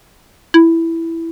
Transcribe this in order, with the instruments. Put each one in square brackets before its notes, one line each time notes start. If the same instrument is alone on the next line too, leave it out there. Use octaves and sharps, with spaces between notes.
[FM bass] E4